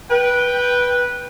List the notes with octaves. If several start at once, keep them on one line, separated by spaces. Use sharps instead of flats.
B4 G5